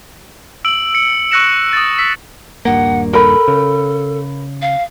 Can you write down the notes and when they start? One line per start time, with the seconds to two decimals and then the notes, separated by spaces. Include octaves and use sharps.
0.65 E6 D7 F#7
0.94 C#7
1.31 C#6 E6 F#6 A#6 C#7 E7
1.73 D#6 A6
1.99 E6 B6
2.65 D#1 G2 A#3 F#5
3.13 A4 A#4 B5
3.48 C#3
4.62 F5